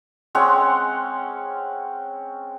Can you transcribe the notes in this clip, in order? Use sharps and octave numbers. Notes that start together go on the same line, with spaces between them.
G#3 C4 C#4 F#5